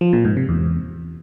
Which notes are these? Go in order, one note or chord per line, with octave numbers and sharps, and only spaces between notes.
F3
A#2
G#2
C3
E2